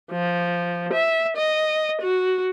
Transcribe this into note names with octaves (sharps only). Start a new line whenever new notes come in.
F3
E5
D#5
F#4